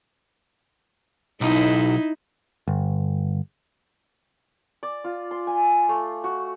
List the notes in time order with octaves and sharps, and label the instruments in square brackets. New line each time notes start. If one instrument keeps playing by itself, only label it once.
[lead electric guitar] B1 [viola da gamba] D#4 E4
[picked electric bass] G1
[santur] D5
F4
C6
G#5
A3
F#4